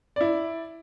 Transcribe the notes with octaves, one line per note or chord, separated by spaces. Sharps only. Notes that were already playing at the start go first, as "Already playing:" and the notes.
E4 D5